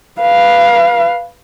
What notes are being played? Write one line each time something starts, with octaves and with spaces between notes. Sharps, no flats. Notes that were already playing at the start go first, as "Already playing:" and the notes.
B4 F5